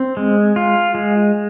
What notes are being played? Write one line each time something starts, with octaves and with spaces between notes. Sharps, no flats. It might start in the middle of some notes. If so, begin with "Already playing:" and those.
Already playing: C4
G#3
F4
G#3